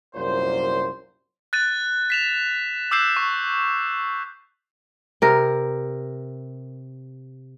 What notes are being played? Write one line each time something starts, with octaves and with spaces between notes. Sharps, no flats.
C2 F#2 A#2 C5
F#6 A6 D#7
B6 E7 F7
D6 E6 F#6 G6 C7 E7
C#6
C3 A#4